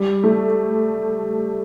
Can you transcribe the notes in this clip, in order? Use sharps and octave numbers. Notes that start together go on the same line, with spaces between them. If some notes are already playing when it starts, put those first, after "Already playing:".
Already playing: G3
A3